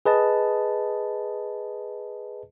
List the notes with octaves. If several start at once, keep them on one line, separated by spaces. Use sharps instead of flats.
G#4 B4 D#5 A5